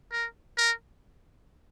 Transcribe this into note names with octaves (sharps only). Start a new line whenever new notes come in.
A#4
A#4